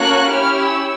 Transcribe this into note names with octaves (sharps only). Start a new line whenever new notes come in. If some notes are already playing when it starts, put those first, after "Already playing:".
Already playing: A#3 C#4 F#4 A4 F#6
C#4 E4 G4 F6
E6